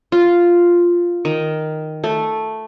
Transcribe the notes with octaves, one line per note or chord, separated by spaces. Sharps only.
F4
D#3
A3